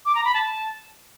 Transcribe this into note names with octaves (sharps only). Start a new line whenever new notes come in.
D6
A#5
B5
A5